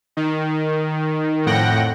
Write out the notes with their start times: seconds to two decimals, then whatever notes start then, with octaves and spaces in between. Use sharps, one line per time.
0.17 D#3
1.46 F2 A2 F#5 G5 A#6